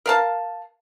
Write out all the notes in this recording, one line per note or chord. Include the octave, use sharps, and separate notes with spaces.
A#4 F5 A5